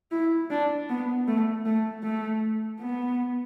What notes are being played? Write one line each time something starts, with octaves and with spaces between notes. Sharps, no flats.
E4
D4
B3
A3
A3
A3
B3